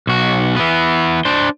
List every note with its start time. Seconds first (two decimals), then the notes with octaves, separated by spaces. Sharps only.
0.07 B1 F#4
0.56 E3 B3
1.25 D4 C5